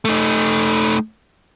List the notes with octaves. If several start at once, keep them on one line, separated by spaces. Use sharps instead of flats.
A3 D#4